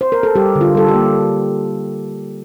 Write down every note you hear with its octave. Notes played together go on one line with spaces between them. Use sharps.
C5
A#4
A4
G3 G4
D3
F4
G3 A4
G4
A#3